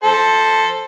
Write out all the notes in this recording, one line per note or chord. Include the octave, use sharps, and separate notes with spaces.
A4 C5